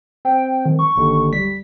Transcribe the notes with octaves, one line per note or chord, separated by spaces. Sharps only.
C4 G5
D#3
C#6
G1 D#2 D3
G3 B6